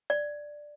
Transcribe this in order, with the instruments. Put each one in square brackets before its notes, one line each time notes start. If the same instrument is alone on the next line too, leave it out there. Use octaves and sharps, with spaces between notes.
[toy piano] D5